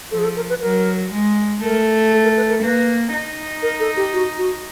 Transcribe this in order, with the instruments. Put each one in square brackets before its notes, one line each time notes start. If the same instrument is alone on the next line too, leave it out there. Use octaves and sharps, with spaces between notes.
[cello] F3 [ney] A4
[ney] G#4
A4
A#4
B4
[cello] F#3 [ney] A#4
[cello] G#3
[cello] A3 [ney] A#4
[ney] A4
A#4
B4
A#4
[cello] A#3 [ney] B4
[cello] D#4
[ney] A#4
A4
G4
F#4
F#4